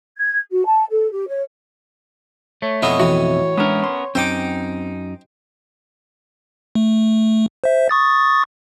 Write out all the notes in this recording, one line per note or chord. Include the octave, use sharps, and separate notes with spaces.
G#6
F#4
A5
A4
G4
C#5
A3 C#5
F2 B2 A3 B3 E4 C#5 D#5
A2 E3 F#4
G#3 B3 C#4 D4 A#4
C6
F#2 C4 D#4 C5 G5 D6
A3
C5 E5
C#6 D#6 A6